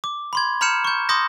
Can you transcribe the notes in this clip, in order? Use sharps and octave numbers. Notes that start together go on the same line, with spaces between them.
D6
B5 C6 G#6
A#5 B5 F6 G6 C#7 E7
C#6 G6
C6 D6 D#6 G6 A#6